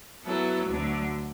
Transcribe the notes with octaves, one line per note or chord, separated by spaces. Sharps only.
F#3 B3 E4 A4
D2 D3 F#3